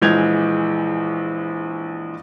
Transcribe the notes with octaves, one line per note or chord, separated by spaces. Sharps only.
A#1 E3 G#3 G6 G#6 F7